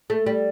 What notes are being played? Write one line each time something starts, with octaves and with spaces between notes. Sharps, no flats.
A3
G3